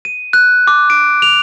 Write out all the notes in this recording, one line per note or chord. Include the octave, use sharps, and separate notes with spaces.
D#7
F#6
D6
D7
F7